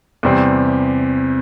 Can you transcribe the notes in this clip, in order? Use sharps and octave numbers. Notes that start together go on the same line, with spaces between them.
E2 C3 G3 C4